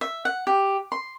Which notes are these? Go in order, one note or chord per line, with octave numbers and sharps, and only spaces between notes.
E5
F#5
G4
C6